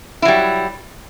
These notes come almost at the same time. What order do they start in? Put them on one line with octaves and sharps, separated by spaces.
E4 F#3 G3